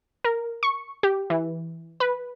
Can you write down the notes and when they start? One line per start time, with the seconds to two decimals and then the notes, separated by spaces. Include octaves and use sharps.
0.24 A#4
0.63 C#6
1.03 G4
1.30 E3
2.00 B4